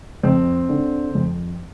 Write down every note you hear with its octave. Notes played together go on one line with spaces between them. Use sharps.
F2 C4
D3
F2